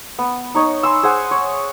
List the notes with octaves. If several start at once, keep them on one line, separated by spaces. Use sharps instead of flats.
B3
D#4 C#5 D#5
G#5 C6 E6
G#4 C5 F#5 G#5
C#5